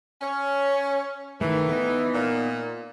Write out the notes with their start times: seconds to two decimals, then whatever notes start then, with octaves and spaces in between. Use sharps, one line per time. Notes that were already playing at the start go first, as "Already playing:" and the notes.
0.22 C#4
1.41 D#3 E3 A3
1.69 B3 D#4
2.14 A#2